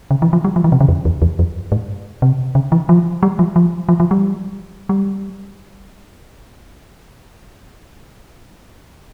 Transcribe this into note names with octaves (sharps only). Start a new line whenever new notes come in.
C#3
E3
F3
G3
F3
E3
C3
C#3
F2
E2
E2
F2
G#2
C3
C#3
E3
F3
G3
F3
F3
F3
F3
G3
G3